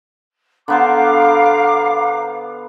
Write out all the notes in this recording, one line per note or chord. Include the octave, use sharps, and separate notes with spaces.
D3 B3 C5 F5 A#5 D6